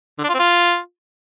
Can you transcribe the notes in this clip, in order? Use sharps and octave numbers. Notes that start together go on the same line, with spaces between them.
D3
D4
F4
C4
F4